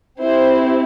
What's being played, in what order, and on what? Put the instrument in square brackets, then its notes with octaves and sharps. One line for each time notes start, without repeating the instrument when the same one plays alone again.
[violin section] C4 E4 G4 C5